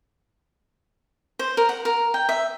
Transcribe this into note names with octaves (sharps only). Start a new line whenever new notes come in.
C5
A#4
F#5
A#4
G5
E5